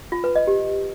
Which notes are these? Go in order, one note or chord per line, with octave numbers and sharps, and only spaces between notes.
F4
B4
D#5
G4